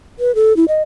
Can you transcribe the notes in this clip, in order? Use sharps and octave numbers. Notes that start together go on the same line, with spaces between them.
B4
A4
E4
D#5